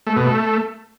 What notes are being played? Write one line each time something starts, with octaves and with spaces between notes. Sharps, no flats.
A3
B2
A3